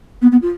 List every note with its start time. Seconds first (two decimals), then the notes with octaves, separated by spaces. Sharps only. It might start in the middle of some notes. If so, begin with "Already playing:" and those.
0.21 B3
0.32 B3
0.42 F4